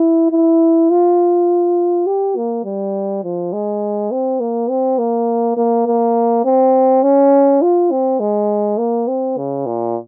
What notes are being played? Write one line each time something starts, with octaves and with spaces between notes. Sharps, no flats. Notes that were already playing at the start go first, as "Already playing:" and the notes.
Already playing: E4
E4
F4
G4
A#3
G3
F3
G#3
C4
A#3
C4
A#3
A#3
A#3
C4
C#4
F4
C4
G#3
A#3
C4
C#3
A#2